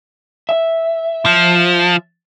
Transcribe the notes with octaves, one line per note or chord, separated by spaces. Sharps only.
E5
F3